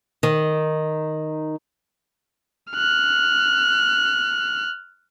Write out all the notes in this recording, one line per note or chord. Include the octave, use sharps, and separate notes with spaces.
D#3
F6 F#6